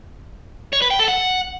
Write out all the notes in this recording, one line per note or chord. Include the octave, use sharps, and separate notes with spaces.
C#5
B4
G5
A4
F#5